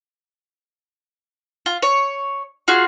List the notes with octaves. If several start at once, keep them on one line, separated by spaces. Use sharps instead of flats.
F4
C#5
F4 F#4 G#4